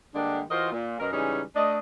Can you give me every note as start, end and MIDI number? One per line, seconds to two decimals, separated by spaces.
0.15 0.41 50
0.15 0.41 55
0.15 0.41 56
0.15 0.41 58
0.15 0.41 62
0.50 0.68 52
0.50 0.68 65
0.50 0.68 66
0.50 0.68 70
0.50 0.68 72
0.50 0.68 75
0.72 0.99 46
1.00 1.08 42
1.00 1.08 47
1.00 1.08 70
1.13 1.42 49
1.13 1.42 52
1.13 1.42 55
1.13 1.42 56
1.13 1.42 61
1.13 1.42 63
1.55 1.78 57
1.55 1.78 62
1.55 1.78 75